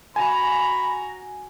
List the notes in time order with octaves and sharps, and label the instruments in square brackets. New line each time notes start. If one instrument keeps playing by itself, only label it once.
[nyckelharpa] F#4 A#5 [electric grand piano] G#5 [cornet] B5